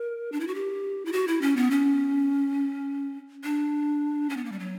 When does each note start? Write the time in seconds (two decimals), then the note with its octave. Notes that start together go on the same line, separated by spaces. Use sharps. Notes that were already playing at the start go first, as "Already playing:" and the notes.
Already playing: A#4
0.32 D4
0.40 E4
0.47 F#4
0.55 G4
1.06 E4
1.12 F#4
1.27 E4
1.41 C#4
1.56 B3
1.71 C#4
3.44 D4
4.30 C#4
4.37 B3
4.45 A#3
4.52 G3
4.59 F#3